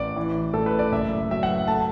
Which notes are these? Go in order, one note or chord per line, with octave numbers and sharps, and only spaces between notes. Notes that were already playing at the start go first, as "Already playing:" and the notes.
Already playing: A1 D5
E3
A2 A4
B4
D5
F#1 E5
F#3 E5
F#5
A3 A5